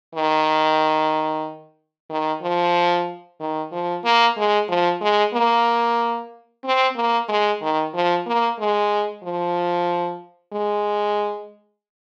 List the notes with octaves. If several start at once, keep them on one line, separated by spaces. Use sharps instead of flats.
D#3
D#3
F3
D#3
F3
A#3
G#3
F3
G#3
A#3
C4
A#3
G#3
D#3
F3
A#3
G#3
F3
G#3